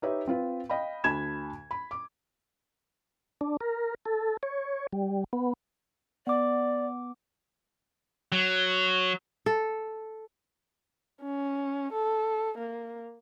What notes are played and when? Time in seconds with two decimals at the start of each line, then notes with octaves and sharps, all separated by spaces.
0.02 D#4 G4 B4 C#5 E5
0.27 C4 F4 B4
0.69 D#5 F5 G5 B5
1.04 D2 A5 B5 G#6 E7
1.71 B5
1.91 D6
3.41 D4
3.61 A#4
4.05 A4
4.43 C#5
4.93 G3
5.33 B3
6.27 B3 D5 D6
8.32 F#3
9.46 A4
11.21 C#4
11.92 A4
12.58 A#3